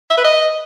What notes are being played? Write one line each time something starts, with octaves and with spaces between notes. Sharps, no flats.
E5
B4
D#5